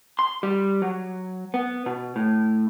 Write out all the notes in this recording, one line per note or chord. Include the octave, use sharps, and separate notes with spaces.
C6
G3
F#3
B3
B2
A2